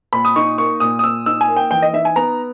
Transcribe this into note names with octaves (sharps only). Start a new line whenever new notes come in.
A#2 B5
D#6
D#4 C#6
A#3 C#6
A#2 D#6
D#6
A#2 E6
D#4 E6
G#5
A#3
G5
E3 G5
D#5
D#4 E5
G#5
B3 A#5